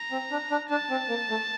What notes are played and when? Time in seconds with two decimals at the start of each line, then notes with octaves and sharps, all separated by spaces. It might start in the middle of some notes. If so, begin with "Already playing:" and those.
Already playing: A#5
0.11 C4
0.31 D4
0.51 D4
0.69 D4 A5
0.90 C4
1.09 A#3
1.30 A3